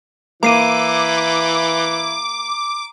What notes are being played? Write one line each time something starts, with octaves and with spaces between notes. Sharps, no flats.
E3 A#3 E4 A#5 D6 C7 D#7